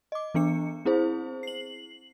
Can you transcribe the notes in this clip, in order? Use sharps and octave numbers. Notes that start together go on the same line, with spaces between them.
D#5 D6
E3 B3 D4 C#7
C4 E4 G#4 C5
C7 F#7